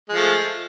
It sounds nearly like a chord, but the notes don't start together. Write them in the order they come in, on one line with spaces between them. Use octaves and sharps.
G#3 F3 A3